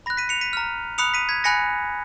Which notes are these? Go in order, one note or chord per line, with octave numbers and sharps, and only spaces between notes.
B5 F#6 A#6
B6 D#7
C#7 F7
B6 D#7
A#5 F6
B5 D#6 F#6 C#7 F7
B6 D#7
G#6 B6
G#5 B5 F#6 A#6 C#7